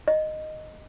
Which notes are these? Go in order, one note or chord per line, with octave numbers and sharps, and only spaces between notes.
D#5